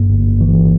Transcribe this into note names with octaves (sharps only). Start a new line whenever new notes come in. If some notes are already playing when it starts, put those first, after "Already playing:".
Already playing: G1 G2 A#3
G1
E3